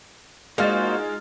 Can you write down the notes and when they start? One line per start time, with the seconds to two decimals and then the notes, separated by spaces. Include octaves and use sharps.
0.58 G#3 A#3 D#4 F4 F#4 C5 F6 A6